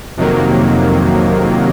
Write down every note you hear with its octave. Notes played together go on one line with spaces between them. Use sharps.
F2 C3 D#3 F#3 A#3